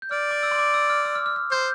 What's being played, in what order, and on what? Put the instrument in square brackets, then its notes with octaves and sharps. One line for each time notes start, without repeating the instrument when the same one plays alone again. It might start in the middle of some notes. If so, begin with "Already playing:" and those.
[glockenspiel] G6
[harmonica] D5 [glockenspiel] F6
[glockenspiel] D6
E6
C6
D6
E6
F6
E6
F6
F6
F6
[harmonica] C5 [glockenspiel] G6